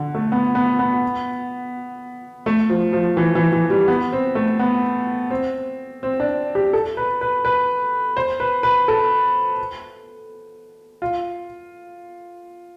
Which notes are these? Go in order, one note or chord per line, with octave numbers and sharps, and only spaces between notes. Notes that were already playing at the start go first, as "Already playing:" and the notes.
Already playing: D3
A3
B3
B3
B3
A3
F3
F3
E3
E3
E3
G3
B3
C4
A3
B3
C4
C4
D4
G4
A4
B4
B4
B4
C5
B4
B4
A4
F4